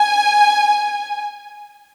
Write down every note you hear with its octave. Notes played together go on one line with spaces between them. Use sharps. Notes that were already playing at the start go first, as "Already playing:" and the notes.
Already playing: G#5